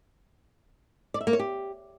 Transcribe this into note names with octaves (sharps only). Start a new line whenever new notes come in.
D5
E5
A#3
C#5
G4